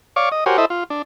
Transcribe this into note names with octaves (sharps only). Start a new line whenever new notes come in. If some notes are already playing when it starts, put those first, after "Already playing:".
C#5 D5 F5 C#6 D6
D#5
F#4 G4 A#4 C5 C#5 G#5
E4 A4 C5 D#5 E5
F4
D4